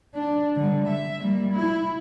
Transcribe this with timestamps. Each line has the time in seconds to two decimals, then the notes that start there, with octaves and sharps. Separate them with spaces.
0.14 D4
0.56 D3 G3
0.87 E5
1.22 G3 A#3
1.52 E4